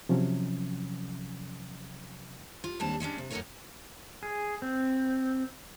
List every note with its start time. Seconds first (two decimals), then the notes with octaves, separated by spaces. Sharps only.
0.09 C3 F3 F#3 C#4
2.64 F4
2.80 D#2 G#2 G3 C4 D4 A5
3.00 G3 G#3 C#4 D4
3.18 C3
3.31 F#2 A2 D#4 A4 A#4 C#5
4.23 G#4
4.62 C4